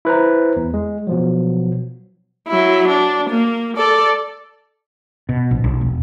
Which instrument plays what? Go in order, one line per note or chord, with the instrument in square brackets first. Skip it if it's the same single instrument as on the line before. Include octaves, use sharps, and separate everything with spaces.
[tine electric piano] E4 B4 C5 A#5
E2
G#3
B2 F3 F#3
[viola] F#3 E4
D4
A#3
A4 D5
[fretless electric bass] B2
A#1
B1
E1